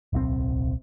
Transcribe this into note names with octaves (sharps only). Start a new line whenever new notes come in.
D1 B1 C3 C4